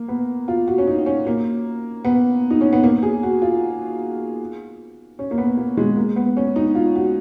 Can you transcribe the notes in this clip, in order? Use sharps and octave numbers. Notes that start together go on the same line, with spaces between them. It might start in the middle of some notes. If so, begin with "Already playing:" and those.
Already playing: A#3
B3
F4
F#4
C#4
D#4
C#4
A#3
B3
D#4
C#4
B3
A#3
G#4
F#4
F4
C#4
A#3
B3
A#3
G#3
A#3
B3
C#4
D#4
F4
F#4